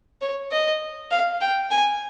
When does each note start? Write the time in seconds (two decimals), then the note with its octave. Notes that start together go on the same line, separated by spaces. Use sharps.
0.21 C#5
0.51 D#5
1.11 F5
1.41 G5
1.71 G#5